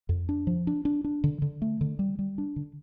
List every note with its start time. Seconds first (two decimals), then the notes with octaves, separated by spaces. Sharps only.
0.09 F2
0.29 D4
0.47 F3
0.67 D4
0.85 D4
1.04 D4
1.24 D3
1.42 D3
1.62 A3
1.81 D3
1.99 G3
2.19 G3
2.38 D4
2.56 D3